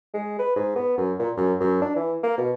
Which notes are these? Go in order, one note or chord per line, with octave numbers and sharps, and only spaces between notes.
G#3
B4
G#2
B3
F#2
A#2
F#2
F#2
D4
E3
A#3
B2